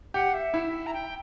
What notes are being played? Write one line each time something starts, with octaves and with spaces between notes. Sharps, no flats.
G4 F#5
E5
E4
A#5
G5